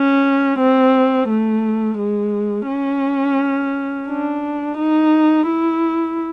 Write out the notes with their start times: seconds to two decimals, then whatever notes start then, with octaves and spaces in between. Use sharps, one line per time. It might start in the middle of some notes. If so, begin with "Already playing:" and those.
Already playing: C#4
0.59 C4
1.29 A3
1.98 G#3
2.68 C#4
4.08 D4
4.78 D#4
5.47 E4